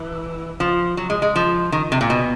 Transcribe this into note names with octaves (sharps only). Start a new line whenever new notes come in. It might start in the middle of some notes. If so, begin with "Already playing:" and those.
Already playing: E3
F3
F#3
G#3
G#3
F3
D#3
C3
A#2
B2